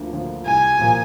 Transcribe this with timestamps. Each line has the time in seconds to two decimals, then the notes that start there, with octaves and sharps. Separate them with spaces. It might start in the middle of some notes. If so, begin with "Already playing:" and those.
Already playing: D2 D3 F3 A#3
0.12 D3 F3 A#3
0.45 C2 G#5
0.79 A#2 F3 A#3